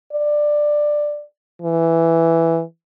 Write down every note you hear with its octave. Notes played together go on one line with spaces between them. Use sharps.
D5
E3